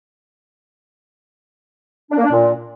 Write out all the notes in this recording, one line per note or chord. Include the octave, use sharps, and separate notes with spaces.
D4
A#3
D4
A#2